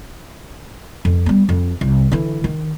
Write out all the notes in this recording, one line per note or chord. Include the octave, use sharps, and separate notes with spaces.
F2
G3 B3
F2
C2
D3 E3
D#3